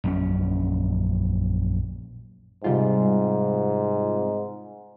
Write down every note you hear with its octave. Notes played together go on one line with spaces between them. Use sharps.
A#1 F#2 C#3 C#4
G#2 C3 G3 F4